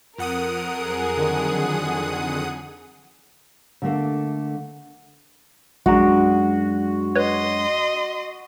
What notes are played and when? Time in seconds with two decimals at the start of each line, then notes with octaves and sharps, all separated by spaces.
0.18 F2 A#4 F#5 D#6
0.77 F#3 G#4
1.17 D3 D#3
3.82 D3 A3 A#3
5.86 A#1 F#2 G#3 D4 F#4 A#5
7.16 B4 C#5 D#5 C6